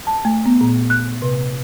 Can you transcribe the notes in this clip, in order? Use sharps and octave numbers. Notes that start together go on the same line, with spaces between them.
A5
A3
B3
A#2
F#6
C3